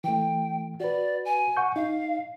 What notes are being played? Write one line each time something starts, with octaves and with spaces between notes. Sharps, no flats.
E3 A3 G5
F#4 B4 D5
G#5
F#5 C#6 G6
D#4 F5